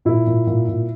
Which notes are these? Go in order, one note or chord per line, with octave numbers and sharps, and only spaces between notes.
A#2 E4
A#2
A#2
A#2